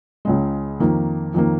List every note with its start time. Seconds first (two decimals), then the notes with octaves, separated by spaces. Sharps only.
0.25 C#2 C#3 G#3
0.80 F2 D#3 A#3
1.34 F2 D#3 A#3